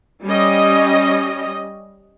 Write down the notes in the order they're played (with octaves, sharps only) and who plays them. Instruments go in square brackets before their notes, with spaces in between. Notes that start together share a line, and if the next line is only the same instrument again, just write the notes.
[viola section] G3 C#4 D#5